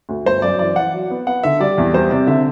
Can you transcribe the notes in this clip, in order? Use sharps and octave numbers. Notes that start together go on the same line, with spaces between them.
D2
G1 C5
F#2 D5
E3 D5
E3 F#5
F#3
B3
B3 F#5
D3 E5
G3 D5
E2
G3 C5
C3 D5
D3 E5